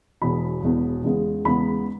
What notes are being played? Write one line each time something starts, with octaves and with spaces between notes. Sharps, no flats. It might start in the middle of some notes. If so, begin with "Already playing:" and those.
E1 E2 B2 B5
E1 E2 B2
E2 C#3 G#3 B3
E2 C#3 G#3 B3 B5